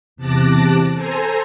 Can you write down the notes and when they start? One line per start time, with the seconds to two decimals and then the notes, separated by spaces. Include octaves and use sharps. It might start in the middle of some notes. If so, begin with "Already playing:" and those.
0.16 E2 C3 A5 D6 F#6 A#6
0.93 A4 C5 G#5 A#5